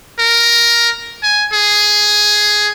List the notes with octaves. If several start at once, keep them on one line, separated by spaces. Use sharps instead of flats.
A#4
G#5
G#4